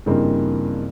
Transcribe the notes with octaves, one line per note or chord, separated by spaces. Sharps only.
G2 C#3 E3 A#3 C4 D#4